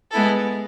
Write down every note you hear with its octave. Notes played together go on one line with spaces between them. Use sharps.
G#3 B3 E4 A4